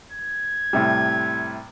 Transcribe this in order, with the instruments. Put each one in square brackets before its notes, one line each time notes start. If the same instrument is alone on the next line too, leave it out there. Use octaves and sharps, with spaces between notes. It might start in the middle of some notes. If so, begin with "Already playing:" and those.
[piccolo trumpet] G#6
[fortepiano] A2 C3 G3